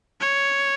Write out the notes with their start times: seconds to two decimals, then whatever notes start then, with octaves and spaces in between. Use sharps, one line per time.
0.21 C#5